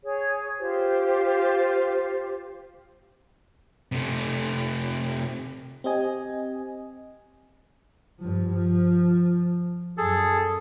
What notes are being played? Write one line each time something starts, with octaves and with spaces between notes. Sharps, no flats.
G#4 C#5
F4 G4 C5
C3 A3
C4 G4 D#5 G#5
G2 F3
F3
F#2 G#4 A4